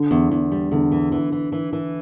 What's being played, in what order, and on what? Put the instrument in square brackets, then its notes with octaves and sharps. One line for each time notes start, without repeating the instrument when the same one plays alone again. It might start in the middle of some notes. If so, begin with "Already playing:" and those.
Already playing: [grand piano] D3
[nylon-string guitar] E2
E2
G3
[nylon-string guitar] E2 [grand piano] D3
[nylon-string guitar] E3
E3
E3
E3
E3